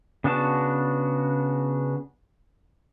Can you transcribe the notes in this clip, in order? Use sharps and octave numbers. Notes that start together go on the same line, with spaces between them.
C#3 B3 D4 F#4 A5